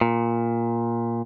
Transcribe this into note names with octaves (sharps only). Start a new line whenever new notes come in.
A#2